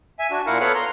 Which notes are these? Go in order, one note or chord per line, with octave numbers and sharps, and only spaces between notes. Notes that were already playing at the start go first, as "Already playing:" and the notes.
E5 G#5
D4 F#4
A#2 E4 A#4 F5 F#5
B3 A4 B4 C#5 F5 F#5
A#5 C6